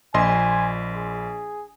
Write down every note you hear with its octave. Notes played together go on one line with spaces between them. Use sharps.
A#1 D#5 G#5 C6
G#4